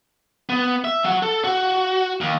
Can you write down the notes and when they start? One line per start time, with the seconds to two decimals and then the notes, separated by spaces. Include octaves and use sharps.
0.49 B3
0.84 E5
1.04 F#3 F#5
1.23 A4
1.44 F#4
2.21 D#2